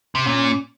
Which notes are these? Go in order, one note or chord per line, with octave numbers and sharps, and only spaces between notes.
C3
A#2 C#4